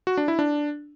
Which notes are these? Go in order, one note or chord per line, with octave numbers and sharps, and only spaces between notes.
F#4
D4
E4
D4